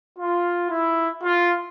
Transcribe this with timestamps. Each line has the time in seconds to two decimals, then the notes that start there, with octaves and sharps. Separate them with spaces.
0.18 F4
0.70 E4
1.23 F4